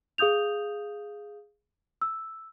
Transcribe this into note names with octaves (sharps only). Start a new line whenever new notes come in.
G#4 F5 D#6 G6 F7
E6